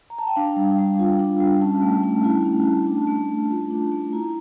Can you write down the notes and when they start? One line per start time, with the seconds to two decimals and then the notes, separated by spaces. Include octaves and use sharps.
0.10 A#5
0.19 A5
0.27 G5
0.36 D4 F5
0.56 G3
0.78 G3
0.99 F4
1.19 D4
1.40 G3
1.61 C#4 A5
1.82 A3
2.04 A3
2.24 E4
2.45 C#4
2.66 A3
2.87 D4 A5
3.07 A3
3.29 A3
3.50 F4
3.70 D4
3.92 A3
4.13 E4 A#5